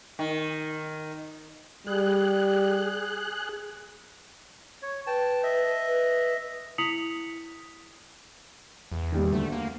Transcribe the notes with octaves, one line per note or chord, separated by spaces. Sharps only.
D#3
G3 G#4 F#6
C#5
B4 G5 A5
D#5 E5
B4
E4 D#6 B6 C#7 F7 F#7
E2
D#3 G3 A#3
D2 A3
A#3